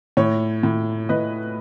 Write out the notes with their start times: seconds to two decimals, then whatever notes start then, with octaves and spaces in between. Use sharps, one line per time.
0.17 A2 C#5
0.63 A2
1.09 A2 B4 D#5